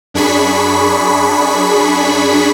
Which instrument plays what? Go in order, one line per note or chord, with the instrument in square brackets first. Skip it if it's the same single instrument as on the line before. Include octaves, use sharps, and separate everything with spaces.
[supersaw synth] F#2 D4 G#4 B5 C#6 B6